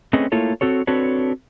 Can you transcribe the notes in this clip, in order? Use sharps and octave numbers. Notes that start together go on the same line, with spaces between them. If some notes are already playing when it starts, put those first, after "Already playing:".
A3 C4 C#4 G#4 B4 D#5
A3 A#3 E4 F4 A4 C#5
C4 F#4 A4 C#5
C4 D4 F#4 A4 B4 C#5